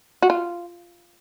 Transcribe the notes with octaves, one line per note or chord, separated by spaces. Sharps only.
F#4
F4